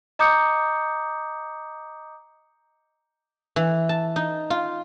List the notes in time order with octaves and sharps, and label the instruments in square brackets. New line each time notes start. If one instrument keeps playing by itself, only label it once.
[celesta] D#5 A#5 D6 D#6 G6 C#7
[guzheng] E3
A5
D#4
F4